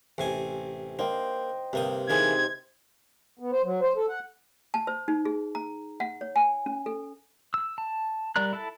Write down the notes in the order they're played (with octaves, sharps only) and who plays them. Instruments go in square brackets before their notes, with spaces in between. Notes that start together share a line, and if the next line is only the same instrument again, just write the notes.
[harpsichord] A1 C3 G#5
[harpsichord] A#3 [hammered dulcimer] C5 D#5 G5
[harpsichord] G2 A#3 D#6 [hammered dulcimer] C3
[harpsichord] E3 G#3 A#3 [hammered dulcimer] D#4 C5 [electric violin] G#6
[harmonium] B3
C5
F#3
C5
A4
F#5
[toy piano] A5
C5
D#4
G#4
A#5
F#5
C#5
G#5
C#4
A4
[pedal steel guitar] E6
A5
G3 A#4 D5 A#5 F#6
E4 A4 E5 A5